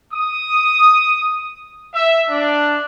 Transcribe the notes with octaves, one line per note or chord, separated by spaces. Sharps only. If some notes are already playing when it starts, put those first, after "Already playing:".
D#6
E5
D4